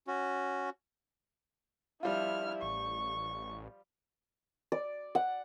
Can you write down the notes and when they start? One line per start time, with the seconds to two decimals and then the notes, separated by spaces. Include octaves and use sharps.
0.07 C#4 F#4
2.03 F3 G3 E4 F4 F6
2.62 A1 C#6
4.72 D5
5.15 F#5